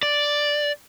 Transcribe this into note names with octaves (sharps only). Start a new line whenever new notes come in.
D5